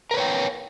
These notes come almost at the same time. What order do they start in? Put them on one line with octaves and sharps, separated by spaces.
A#4 B4 C#5 G5